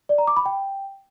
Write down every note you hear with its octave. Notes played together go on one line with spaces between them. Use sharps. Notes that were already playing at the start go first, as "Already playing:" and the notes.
D5
A#5
D6
B5
G5